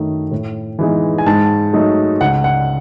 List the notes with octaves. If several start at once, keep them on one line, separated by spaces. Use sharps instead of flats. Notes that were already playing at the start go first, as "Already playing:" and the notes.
Already playing: F#2 D#3 A3 D#4
A2
E3 G#3 B3 D#4
G#5
G#2 A5
F#3 A3 D#4
C#2 F#5
F#5